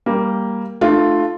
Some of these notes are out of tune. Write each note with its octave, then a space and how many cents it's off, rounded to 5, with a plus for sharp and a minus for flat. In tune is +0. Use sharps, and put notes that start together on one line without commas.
G3 +0 A#3 +0
A3 +0 D4 +40 F4 +0